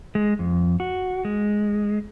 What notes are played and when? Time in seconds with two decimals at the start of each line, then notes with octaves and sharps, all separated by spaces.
0.15 G#3
0.39 F2
0.80 F#4
1.25 G#3